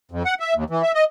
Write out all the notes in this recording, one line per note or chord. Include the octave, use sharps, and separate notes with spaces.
F2
F#5
E5
D#2
E3
E5
D#5